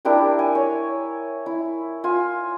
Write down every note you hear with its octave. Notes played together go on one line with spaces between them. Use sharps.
D4 E4 G4 A#4
G#5
C#5
E4
F4 G#5